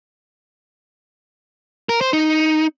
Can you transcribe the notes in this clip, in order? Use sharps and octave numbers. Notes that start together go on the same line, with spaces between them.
A#4
C5
D#4